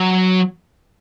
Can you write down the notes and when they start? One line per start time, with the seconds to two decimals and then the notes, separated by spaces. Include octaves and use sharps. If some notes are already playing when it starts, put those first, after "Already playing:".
Already playing: F#3